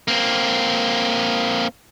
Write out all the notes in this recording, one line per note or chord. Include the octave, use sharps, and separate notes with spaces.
A#3 C4